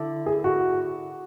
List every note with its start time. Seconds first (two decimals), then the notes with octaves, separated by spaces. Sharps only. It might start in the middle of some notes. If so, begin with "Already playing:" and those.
Already playing: D3 E4
0.26 G#4
0.44 F#4